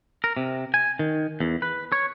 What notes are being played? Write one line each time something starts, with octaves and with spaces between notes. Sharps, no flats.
A#4
C3
G#5
D#3
E2
B4
C#5